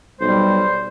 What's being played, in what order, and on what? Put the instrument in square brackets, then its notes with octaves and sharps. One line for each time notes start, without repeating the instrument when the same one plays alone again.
[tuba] B1 [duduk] G3 [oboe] C5